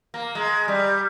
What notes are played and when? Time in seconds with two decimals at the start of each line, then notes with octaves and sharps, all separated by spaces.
0.14 A#3
0.35 G#3
0.68 G3